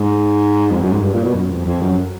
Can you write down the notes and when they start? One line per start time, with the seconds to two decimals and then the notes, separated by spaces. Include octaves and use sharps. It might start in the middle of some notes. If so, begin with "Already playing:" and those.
Already playing: G#2
0.71 F2
0.81 F#2
0.93 G#2
1.02 G2
1.13 A#2
1.24 B2
1.34 F#2
1.50 F2
1.65 F2
1.82 F#2